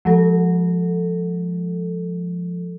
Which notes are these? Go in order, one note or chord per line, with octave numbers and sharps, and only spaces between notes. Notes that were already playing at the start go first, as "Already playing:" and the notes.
F3 G#3 A4